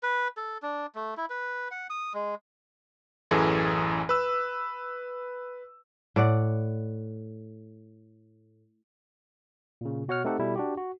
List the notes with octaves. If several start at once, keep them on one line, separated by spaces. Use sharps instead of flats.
B4
A4
D4
A3
E4
B4
F#5
D#6
G#3
A1 F#2 E3 G#4 A4
B4 E6
A2 D5 F#5
A#2 C#3
B2 F#4 C#5 F#5 F6
A3 C4 D#4 G4 A4 F#5
B2 G3 E4 A4
D4 F#4 G4
F#4